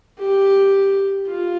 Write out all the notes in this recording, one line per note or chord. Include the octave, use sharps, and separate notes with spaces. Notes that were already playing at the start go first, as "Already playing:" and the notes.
G4
F4